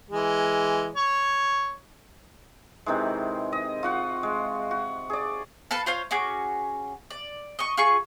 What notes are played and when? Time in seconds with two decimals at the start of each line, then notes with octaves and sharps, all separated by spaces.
0.10 E3 G#3
0.96 C#5
2.86 C3 D#3 E3 G#3
3.53 D#5
3.83 F4 F#4 F#5
4.23 G#3
4.71 F#4
5.10 G#4 D5
5.71 A4 B4 F5 A5
5.86 F4 C5 C#5 F5
6.11 C#4 F#4 G#4 D6
7.11 D5
7.59 D#5 C#6
7.77 F4 G#4 C#6